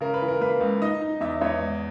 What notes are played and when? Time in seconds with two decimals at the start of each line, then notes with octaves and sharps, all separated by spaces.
0.01 C#3 A#4
0.14 B4
0.22 E3
0.28 A#4
0.41 A#3 B4
0.60 C#2
0.82 D#4 D#5
1.01 D#4
1.21 E2 E5
1.41 E2 C#5
1.61 G#2